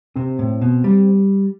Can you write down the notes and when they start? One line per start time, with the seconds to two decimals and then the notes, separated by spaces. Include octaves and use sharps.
0.16 C3 C4
0.39 A2
0.61 B2
0.84 G3